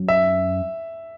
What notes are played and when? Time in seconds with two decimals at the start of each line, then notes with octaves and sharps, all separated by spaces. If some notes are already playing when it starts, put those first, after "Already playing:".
Already playing: F#2
0.08 E5